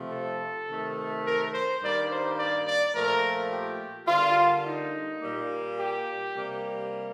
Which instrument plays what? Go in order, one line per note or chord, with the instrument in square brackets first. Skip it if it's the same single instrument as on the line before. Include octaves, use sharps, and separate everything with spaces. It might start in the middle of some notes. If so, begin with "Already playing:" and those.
Already playing: [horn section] C3 F3 A3
A4
C3 D#3 A3
A#4
C5
G2 D#3 G3 A#3 D5
C5
D5
D5
A#2 F3 A3 A#4
G4
D3 G3 A#3 F4
D#4
A#2 G3 A#3
G4
C3 G3 A#3